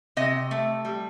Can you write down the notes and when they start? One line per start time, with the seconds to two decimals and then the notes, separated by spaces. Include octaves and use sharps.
0.17 C3 D#5
0.51 A3
0.85 G3